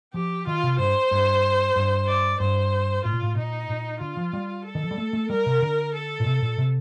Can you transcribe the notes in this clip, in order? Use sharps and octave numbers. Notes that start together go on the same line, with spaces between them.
F3 G4
D#3 F4
C3
G2 C5
G2
G2
D5
G2 C5
A2 F4
A#2
A2
A#2 D#4
A#2
D3 F4
F3
G3
A4
D#3
F3
G3
A3
A3
G3 A#4
C3
D3
A4
A#2
C3
A#2
C3